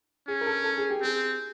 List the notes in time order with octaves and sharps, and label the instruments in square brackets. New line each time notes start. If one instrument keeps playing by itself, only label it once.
[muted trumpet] C#4 [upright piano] G#4
[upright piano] A#4
A4
A4
G#4
G4
[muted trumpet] C4 [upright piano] G#4